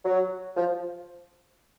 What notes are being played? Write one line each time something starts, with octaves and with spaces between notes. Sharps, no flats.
F#3
F3